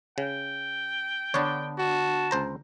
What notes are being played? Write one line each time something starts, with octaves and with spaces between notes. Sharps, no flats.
C#3 G5
D3 B3 D4 C#5
F#4 A5
C#2 C5 A#5